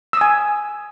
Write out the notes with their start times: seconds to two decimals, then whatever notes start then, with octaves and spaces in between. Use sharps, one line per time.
0.13 E6
0.17 D#6
0.21 G#5